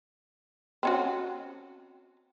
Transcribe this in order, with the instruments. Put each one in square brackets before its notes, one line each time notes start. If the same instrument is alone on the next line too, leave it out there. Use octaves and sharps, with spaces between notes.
[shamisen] C4 C#4 F#4